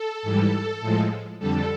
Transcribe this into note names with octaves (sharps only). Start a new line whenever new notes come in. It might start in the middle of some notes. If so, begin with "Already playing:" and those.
Already playing: A4
G#2 E3 G3
A2 F3 G#3
F2 D3 G3 A4